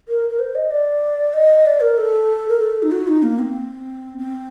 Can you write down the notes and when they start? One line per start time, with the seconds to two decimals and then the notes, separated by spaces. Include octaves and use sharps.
0.08 A#4
0.30 A#4
0.39 C5
0.55 D#5
0.71 D5
1.34 D#5
1.66 D5
1.81 A#4
1.98 A4
2.49 A#4
2.60 A4
2.83 D#4
2.92 F#4
3.07 D#4
3.23 A#3
3.39 C4
4.18 C4